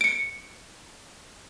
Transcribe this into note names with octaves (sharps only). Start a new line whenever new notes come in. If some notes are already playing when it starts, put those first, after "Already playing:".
C#7 D7